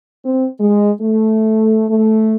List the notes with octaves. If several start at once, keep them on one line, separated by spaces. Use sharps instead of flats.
C4
G#3
A3
A3